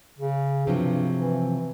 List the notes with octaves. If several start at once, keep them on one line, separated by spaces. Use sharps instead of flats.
C#3
G2 C3 F3 F#3
E3